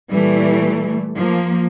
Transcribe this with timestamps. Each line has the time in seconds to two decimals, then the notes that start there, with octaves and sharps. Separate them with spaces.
0.12 A#2 E3 G3 A3
1.18 F3 A#3